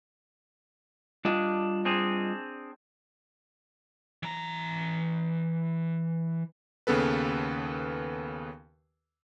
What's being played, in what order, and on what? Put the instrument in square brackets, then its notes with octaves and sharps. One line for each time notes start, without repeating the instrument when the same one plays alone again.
[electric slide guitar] G3 F4 D#5 [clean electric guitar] D4
[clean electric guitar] C4 D4 G#4
[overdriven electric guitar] E3 A#5
[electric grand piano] D#2 C#3 B3 A4 B4